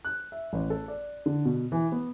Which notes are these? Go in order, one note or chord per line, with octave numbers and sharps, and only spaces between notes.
F#6
E5
A1
A4
D5
D3
B2
E3
B3